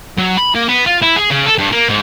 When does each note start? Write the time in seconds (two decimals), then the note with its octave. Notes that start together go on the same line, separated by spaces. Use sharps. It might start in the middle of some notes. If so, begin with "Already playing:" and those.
0.18 F#3
0.37 B5
0.55 A#3
0.68 B3
0.86 F4
1.02 E4
1.16 G#4
1.30 C#3
1.46 A4
1.58 G2
1.72 A#3
1.89 G#2